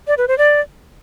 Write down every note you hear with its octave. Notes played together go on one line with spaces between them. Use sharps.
D5
B4
C5
D5